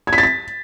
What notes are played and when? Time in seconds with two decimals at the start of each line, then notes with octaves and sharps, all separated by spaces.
0.07 G#6
0.13 B6
0.18 A6
0.23 B6